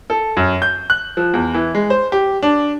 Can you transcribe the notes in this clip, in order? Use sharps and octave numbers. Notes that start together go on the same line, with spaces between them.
A4
F#2
G6
F#6
F3
E2
E3
G#3
C5
G4
D4